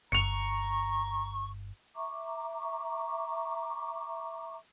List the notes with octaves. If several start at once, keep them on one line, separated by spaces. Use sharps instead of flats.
G1 A#5 C#6 C#7 F7
E5 A#5 C#6 D6